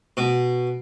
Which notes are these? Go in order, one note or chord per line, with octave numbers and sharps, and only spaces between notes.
B2